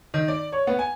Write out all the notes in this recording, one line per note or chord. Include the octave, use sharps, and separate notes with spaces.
D#3
D5
C#5
B3
G#5